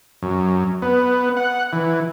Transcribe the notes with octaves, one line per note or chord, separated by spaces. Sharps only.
F#2
B3
F#5
E3